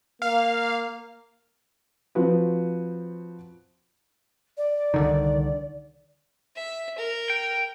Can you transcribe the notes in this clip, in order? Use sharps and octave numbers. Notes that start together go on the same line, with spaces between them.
A#3 F5
F3 C4 F#4 B4
D5
C2 D3 D#3
E5
A#4
G5